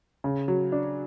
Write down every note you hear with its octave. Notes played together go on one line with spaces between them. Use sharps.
C#3
F#3
D4